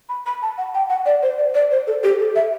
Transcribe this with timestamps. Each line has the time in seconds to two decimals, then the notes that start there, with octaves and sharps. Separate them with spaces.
0.09 B5
0.26 B5
0.43 A5
0.58 F#5
0.74 G5
0.90 F#5
1.06 D5
1.23 C5
1.38 D5
1.55 D5
1.71 C5
1.87 A4
2.03 G4
2.19 A4
2.36 E5